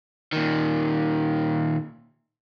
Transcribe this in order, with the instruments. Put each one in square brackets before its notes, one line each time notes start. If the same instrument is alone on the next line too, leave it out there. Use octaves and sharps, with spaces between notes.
[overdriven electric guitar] A#2 D#3